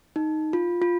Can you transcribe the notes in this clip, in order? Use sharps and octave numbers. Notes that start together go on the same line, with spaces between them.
D#4
F4
F4